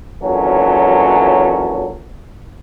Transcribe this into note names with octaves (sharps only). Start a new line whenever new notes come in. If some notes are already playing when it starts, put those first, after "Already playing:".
G#1 A#2 E3 F#3 C#4 A4